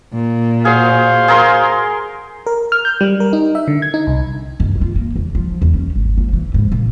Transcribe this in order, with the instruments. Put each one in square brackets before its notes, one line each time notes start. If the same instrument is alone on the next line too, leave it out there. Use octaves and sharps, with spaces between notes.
[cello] A#2
[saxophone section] F#4 C5 F5 [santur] G#4
[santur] G#4 A#4 C6
[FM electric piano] A#4
F6
G6
G3
A#4
D#4
E5
D3
G#6
D#4
C2
[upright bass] G2
F4
A#3
E2
F3
E2
C#4
G#1
F3
E3
G#2
A#2